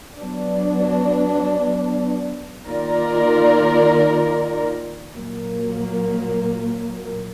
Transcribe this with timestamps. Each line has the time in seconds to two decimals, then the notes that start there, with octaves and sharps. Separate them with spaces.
0.21 F#3 B3 D4
2.68 D#3 A#3 F4 A#4 D5
5.15 A#2 F#3 A#3